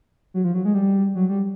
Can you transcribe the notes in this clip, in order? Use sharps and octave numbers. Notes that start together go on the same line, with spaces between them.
F#3
F3
F#3
G#3
G3
F#3
G3